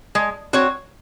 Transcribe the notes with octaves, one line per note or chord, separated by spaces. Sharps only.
G#3
C4 F#4 C#5